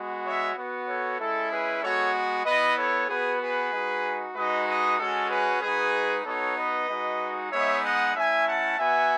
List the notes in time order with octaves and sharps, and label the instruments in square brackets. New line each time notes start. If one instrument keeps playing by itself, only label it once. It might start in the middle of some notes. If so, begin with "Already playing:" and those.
Already playing: [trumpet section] G#3 B3 F#4
C#5 E5
B3 F#4
A4 C#5
G#3 C#4 E4 A4
G#4 B4
G#3 B3 F#4 A4 C#5
B3 E4 B4 D#5
A4 C#5
B3 F#4 G#4 B4
G#4 B4
G#3 D#4 F#4
G#3 D#4 F#4 B4 D#5
B4 D#5
G#3 C#4 F#4 A4
G#4 B4
G#3 D#4 F#4 G#4 B4
B3 D#4 F#4 A4 C#5
B4 D#5
G#3 D#4 F#4
G#3 B3 D#4 C#5 E5
D#5 F#5
A3 C#4 E4 E5 G#5
F#5 A5
B3 F#4 E5 G#5